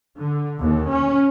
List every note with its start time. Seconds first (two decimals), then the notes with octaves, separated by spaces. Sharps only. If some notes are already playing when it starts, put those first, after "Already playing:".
0.18 D3
0.60 D#2
0.91 C#4